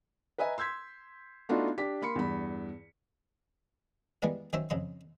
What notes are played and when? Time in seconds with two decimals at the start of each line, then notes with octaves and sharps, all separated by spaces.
0.38 B4 D#5 E5 G#5 A#5
0.58 C6 E6 G6 G#6 B6
1.49 A3 B3 D4 D#4 F4 F#4
1.78 D4 G4 B6
2.02 A#3 B5 C6 C#7
2.16 E2 G2 B5
4.22 E3 G3 G#3 B3 A#4
4.53 D#3 F#3 C#4 C5 E5
4.70 F2 C#3 D#5 C6